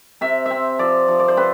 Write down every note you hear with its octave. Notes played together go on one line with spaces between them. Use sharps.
C3 E5
C4 E5
F3 D5
F3
D5
C5
C4 B4